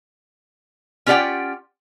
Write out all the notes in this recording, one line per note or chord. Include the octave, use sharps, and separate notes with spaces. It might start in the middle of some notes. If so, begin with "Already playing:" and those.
C#4 F4 G4 D5 F#5 G5